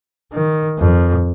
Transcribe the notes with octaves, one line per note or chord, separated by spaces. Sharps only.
D#3
F2